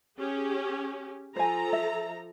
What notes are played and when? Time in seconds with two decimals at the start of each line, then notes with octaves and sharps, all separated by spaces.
0.18 C#4 G4 G#4
1.36 F3 A4 C5 G#5 A#5
1.73 E5